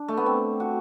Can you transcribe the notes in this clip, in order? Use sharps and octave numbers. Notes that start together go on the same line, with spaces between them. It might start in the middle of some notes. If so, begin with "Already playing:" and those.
Already playing: D4
A3
B3
C4
F#4